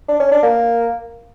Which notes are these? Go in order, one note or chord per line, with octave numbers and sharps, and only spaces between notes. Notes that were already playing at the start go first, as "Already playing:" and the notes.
D4
C#4
D4
A#3